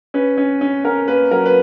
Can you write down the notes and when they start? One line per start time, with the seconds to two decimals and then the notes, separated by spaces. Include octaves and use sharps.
0.14 C#4 B4
0.37 C#4
0.61 C#4
0.84 C#4 A#4
1.08 A#3 B4
1.31 F#3 A#4
1.46 B4